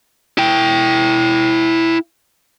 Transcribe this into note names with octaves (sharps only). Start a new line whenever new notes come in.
E4 G5